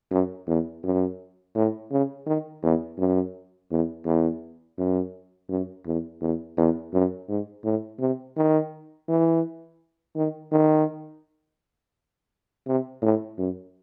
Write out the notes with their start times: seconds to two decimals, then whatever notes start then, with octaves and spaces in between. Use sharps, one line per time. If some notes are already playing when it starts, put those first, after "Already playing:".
0.11 F#2
0.47 E2
0.83 F#2
1.56 A2
1.92 C#3
2.26 D#3
2.63 E2
2.98 F#2
3.71 E2
4.06 E2
4.78 F#2
5.50 F#2
5.86 E2
6.22 E2
6.57 E2
6.94 F#2
7.29 G#2
7.64 A2
8.00 C3
8.37 D#3
9.09 E3
10.16 D#3
10.52 D#3
12.67 C3
13.02 A2
13.38 F#2